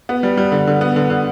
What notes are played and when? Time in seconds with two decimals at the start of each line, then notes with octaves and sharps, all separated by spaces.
0.09 B3
0.23 G3
0.37 G3
0.52 D3
0.67 D3
0.81 B3
0.96 D3
1.10 D3